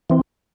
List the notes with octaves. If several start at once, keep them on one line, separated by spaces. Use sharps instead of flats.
E3 C4